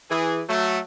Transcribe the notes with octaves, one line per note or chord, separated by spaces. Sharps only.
E3 G#4
F#3 A3